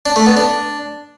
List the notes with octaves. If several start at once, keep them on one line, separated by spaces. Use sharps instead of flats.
D4
A3
B3
D4